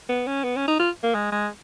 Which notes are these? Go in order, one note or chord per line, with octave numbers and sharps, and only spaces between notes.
B3
C#4
B3
C#4
D#4
F4
A#3
G#3
G#3